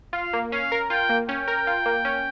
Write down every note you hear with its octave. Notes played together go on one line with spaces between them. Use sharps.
F4 F5
A#3
C#4 F5
A#4
F4 G5
A#3
C#4 G5
A#4
F4
A#3
C#4